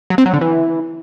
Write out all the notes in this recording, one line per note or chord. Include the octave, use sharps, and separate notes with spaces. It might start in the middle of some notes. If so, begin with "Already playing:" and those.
F#3
C4
F#3
D3
E3